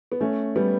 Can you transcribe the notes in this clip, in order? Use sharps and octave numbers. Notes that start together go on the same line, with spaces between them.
B3
A3 C#4
G3 B3